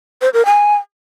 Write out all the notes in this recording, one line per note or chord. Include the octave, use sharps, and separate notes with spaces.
C5
A#4
G#5